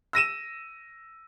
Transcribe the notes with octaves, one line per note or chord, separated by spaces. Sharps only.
E6 A#6 D#7 E7